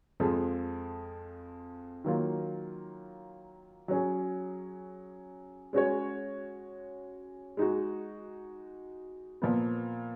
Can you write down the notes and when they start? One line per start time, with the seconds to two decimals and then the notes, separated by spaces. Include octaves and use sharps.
0.20 F2 F3 G#3
2.04 D#3 F#3 A#3 F4
3.88 F#3 C#4 G#4
5.73 G#3 C#4 F#4 C#5
7.57 G#3 D#4 F#4
9.42 A#2 F3 B3